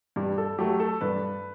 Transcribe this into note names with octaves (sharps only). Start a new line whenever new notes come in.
G2 G4
A4
F#3 A3 G4
A4
G2 B4